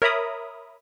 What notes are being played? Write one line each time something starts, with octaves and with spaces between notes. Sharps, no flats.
A#4 C#5 E5 A#5 B5 D#6